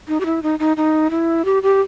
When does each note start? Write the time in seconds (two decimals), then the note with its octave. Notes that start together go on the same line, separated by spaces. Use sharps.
0.08 D#4
0.20 G4
0.26 E4
0.43 D#4
0.59 D#4
0.77 D#4
1.11 E4
1.45 G4
1.63 G4